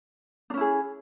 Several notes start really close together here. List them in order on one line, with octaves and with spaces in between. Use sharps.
D4 C#4 E4 G#4